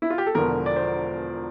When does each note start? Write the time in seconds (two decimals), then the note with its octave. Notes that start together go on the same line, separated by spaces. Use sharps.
0.02 E4
0.10 F4
0.18 G4
0.27 A4
0.35 E1 E2 D3 F3 A#4
0.66 D5
0.76 C5